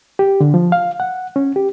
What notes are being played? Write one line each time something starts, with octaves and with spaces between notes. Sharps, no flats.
G4
D3
F3
F5
F#5
C#4
G4